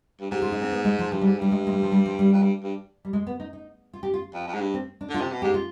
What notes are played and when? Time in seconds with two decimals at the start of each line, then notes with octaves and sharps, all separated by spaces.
0.21 G2
0.31 G#2 G4
0.42 F4
0.52 D#4
0.62 C4
0.72 B3
0.85 G#3
0.99 F3
1.12 G2 F3
1.22 G3
1.25 G#2
1.38 G2 G3
1.52 G#3
1.67 G#3
1.72 G3
1.82 F3
1.92 G3
2.06 F3
2.19 G3
2.33 F2
2.42 G2
2.63 G2
3.05 G3
3.13 G#3
3.27 B3
3.40 D#4
3.53 D#4
3.93 F4
4.03 G4
4.14 F4
4.34 F2
4.47 F2
4.54 G#2
4.61 G2
4.74 C4
5.01 D4
5.10 D3 F4
5.21 C3
5.32 B2
5.42 G#2 G4
5.54 F4